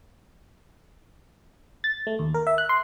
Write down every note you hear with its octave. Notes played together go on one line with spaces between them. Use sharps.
A6
A3
D#2
A#4
E5
F#6
C6